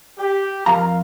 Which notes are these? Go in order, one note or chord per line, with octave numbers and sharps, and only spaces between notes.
G4
F2 F4 A#4 F5 A#5